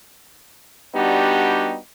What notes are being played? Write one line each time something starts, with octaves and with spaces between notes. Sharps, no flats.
G3 B3 D4 D#4 F#4 G4